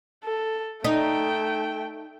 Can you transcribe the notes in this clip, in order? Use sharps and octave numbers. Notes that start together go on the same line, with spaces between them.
A4
A3 D#4 G5